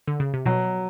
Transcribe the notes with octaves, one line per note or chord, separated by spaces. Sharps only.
D3
C#3
C3
B2 F#3